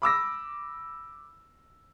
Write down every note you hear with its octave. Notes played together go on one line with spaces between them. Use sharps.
B5 D6 E6 A#6